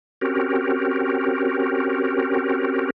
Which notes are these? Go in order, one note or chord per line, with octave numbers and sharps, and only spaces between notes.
C4 C#4 F#4 G4 A#4